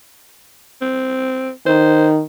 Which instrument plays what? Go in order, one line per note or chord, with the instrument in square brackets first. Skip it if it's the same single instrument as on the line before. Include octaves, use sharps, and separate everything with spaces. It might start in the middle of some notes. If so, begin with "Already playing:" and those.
[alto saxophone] C4
[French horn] D#3 [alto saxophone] C5